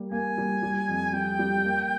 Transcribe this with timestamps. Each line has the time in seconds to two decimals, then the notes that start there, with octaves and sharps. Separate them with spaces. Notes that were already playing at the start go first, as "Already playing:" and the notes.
Already playing: G3 A#3
0.11 A#3 G#5
0.38 G3
0.62 G3
0.88 F2
1.13 G3 G5
1.39 G3
1.64 A#3